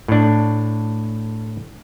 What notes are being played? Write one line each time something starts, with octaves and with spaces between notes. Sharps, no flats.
A2 D4